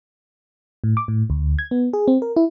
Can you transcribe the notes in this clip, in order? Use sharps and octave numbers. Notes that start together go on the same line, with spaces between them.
A2
D6
A2
D2
G#6
B3
G#4
C4
A#4
E4